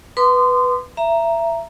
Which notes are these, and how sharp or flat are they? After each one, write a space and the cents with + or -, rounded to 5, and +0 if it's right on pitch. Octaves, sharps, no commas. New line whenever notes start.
B4 +0 C6 -25 D#6 -45
E5 +25 A#5 +0